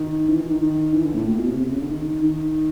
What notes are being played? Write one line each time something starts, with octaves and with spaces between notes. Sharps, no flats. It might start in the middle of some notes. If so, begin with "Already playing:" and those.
Already playing: D#3
E3
D#3
D#3
D#3
E3
D3
A2
A#2
B2
C3
C3
C#3
D3
D#3
D#3